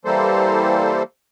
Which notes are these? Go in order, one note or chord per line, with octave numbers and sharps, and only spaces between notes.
E3 G3 A#3 A4 C5